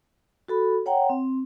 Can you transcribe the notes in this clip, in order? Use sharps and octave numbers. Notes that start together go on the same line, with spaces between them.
F#4 A4 B5
C#5 F#5 G5 A#5
C4